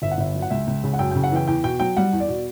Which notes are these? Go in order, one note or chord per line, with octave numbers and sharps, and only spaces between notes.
G1 E5
F#5
G1 E5
F#3
F#5
C#2 E5
C#2
C#3
F#5
F#2 G5
C#3 G5
F#5
E3 G5
E2 G5
B2 G5
F#3 G5
G3 F#5
E2
D5
B2